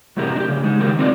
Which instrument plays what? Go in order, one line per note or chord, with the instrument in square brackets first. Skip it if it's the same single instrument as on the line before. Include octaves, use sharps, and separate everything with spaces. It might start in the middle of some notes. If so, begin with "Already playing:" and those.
[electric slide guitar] F#2 A2 C3 G4 A#4
D4 G4
C#3
G#3 D#4
D#3 F#3 G4 A#4
C4 D#4 F4 C5 D5